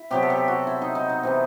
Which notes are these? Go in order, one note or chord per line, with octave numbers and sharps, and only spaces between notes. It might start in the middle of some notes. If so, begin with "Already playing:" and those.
Already playing: E4
C3 F#3 B3 G4
A4
G4
F#4
E4
D#4
D#4
D#4
C3 E3 B3